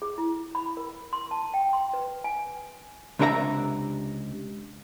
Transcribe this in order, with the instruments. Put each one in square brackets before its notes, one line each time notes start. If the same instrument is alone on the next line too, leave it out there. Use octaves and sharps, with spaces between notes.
[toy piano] G#4
E4
B5
A#4
C6
A5
G5
C6
B4
G#5
[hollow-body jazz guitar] C#2 C3 D4 A#4 E5 A#5